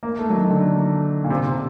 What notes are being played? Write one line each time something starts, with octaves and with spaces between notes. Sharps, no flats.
A#3
A3
F#3
D#3
D3
A#2
C3
C3